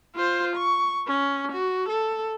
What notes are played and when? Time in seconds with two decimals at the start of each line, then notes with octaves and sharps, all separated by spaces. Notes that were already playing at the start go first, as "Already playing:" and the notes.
0.15 F4 C5
0.56 C#6
1.07 C#4
1.53 F#4
1.89 A4